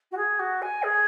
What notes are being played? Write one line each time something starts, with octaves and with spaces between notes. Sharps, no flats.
F#4
G#4
F#4
G#5
G#4